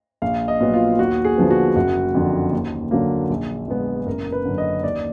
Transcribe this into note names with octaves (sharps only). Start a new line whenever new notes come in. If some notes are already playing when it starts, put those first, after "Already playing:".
A#1 F5
D#5
A#2 F#3 B3
F4
D#2 F#4
G#4
D3 F3 B3
F#4
F#1 F#4
F2 D3
D#2
D3 F#3 A#3
A#1
A#2 G#3 B3
F#1 A#4
B4
F#2 D3
D#5
D#2 D5